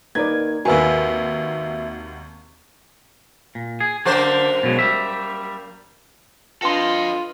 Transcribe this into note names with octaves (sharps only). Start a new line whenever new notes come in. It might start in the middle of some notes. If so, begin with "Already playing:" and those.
A#3 D#4 A#4 B4 D5 G#6
G#1 D#2 F#4 A#4 B4 E5 G#5
A#2
G#4
F#2 D3 A#3 D4 C5
B2 F#3 G#3
G3 E5
D4 F4 A4 B4 D#5 G5 C6 A#6